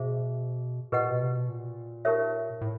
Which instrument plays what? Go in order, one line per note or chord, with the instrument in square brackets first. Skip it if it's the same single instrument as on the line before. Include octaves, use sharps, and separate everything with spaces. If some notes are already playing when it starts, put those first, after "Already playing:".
Already playing: [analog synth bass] B2 [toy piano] G#4 C5 E5
[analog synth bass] A#2 [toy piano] G4 B4 D#5 F#5
[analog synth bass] B2
C3
B2
A#2
[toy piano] D#4 G4 A#4 C#5 E5
[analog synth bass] A2